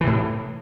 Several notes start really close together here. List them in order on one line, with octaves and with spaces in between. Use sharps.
E3 C3 A2